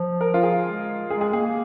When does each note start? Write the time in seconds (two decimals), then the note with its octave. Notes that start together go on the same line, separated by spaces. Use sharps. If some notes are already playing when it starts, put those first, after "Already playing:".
Already playing: F3
0.21 A#4
0.34 F4
0.43 G#4
0.65 G#3
1.10 G#3 G#4
1.21 G#4
1.33 A#3 G#4